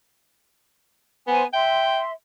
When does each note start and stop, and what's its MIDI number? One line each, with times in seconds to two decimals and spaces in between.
1.28 1.44 59
1.28 1.44 72
1.28 1.44 80
1.53 2.12 76
1.53 2.00 79
1.53 2.12 84